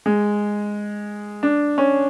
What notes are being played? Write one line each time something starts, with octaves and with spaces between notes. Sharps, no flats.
G#3
D4
C#4